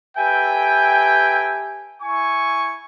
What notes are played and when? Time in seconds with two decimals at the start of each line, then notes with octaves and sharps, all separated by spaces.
0.17 G4 A4 B4 E5 G5 G#5
2.02 E4 G#5 C#6